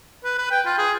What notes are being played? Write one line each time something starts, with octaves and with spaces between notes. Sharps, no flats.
B4
B4
G5
F4
G#4